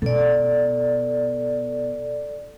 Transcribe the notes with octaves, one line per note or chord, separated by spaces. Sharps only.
B2 A4 D5